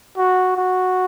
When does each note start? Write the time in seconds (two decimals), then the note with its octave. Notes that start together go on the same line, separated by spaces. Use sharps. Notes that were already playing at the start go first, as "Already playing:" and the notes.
0.17 F#4
0.57 F#4